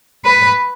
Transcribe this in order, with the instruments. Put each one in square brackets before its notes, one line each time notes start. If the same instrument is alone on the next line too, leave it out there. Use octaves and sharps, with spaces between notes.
[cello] B4